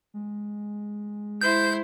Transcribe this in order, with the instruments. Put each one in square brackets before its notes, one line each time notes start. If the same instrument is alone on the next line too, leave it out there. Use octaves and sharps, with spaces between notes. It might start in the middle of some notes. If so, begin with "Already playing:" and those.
[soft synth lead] G#3
[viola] E4 C5 [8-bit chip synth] G6